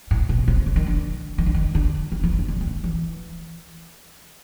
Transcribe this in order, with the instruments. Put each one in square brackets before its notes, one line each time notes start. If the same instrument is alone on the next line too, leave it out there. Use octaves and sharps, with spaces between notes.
[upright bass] A2
B2
C3
D3
D#3
D3
D#3
D3
D#3
D3
D#3
E3
D#3
C#3
D3
E3
D#3
E3